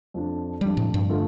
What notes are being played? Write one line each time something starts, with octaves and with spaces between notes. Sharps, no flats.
F2 F3 D4
F2 F3 G3 D4
A2
G2
D3 A3 F4